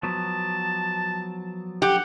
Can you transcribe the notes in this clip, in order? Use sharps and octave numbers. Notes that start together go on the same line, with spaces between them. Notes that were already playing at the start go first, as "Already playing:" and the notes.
F3 F#3 B3 A5
G4 F#5